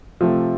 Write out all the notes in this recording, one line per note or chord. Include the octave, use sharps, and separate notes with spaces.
C3 F3 A3